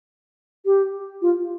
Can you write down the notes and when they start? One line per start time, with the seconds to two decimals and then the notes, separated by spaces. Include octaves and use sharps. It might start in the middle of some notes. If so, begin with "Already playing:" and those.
0.66 G4
1.22 F4